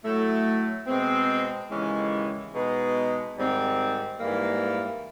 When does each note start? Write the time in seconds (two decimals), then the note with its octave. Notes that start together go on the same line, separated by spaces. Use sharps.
0.04 A2 F#3 A3
0.87 B2 G#3 C4
1.70 D#2 C#3 E3 G#3 C#4
2.53 B2 G#3 B3 D#4 G#4
3.36 G#2 D#3 G3 C4
4.19 G#2 E3 G3 A#3